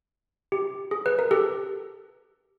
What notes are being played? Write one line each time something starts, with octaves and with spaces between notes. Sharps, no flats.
G4
G#4
B4
A#4
G4 A4